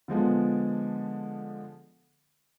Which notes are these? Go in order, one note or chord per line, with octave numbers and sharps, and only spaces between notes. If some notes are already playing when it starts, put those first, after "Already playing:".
D3 F3 G#3 B3